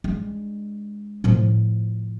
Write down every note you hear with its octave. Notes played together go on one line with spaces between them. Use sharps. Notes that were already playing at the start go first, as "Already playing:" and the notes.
G#3 D4
A2 F3